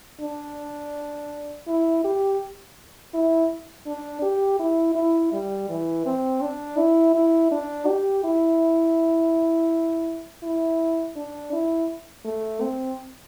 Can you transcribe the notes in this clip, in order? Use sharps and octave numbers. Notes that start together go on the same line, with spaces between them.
D4
E4
G4
E4
D4
G4
E4
E4
G3
E3
C4
D4
E4
E4
D4
G4
E4
E4
D4
E4
A3
C4